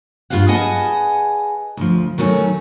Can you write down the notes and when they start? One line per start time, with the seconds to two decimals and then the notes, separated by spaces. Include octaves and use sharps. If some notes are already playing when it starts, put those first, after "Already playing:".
0.30 G2 F4 G4 F5 F#5
0.48 G#4 B4 D#5 F#5 G#5 A5
1.77 D2 F3
2.18 D#3 F#3 A3 C#4